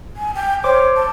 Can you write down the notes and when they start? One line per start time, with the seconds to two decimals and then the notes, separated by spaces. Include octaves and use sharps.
0.17 G#5
0.35 G5
0.64 C5 C#5 D6
0.96 A5